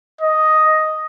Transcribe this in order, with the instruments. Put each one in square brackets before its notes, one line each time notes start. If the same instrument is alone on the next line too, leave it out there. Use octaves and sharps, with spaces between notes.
[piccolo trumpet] D#5